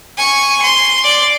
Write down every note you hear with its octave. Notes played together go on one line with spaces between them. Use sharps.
G#5 C#6
C6
D5